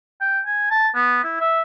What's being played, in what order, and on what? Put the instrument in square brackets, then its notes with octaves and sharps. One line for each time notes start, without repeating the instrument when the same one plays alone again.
[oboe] G5
G#5
A5
B3
E4
E5